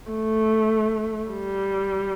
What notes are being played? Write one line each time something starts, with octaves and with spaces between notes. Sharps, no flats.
A3
G3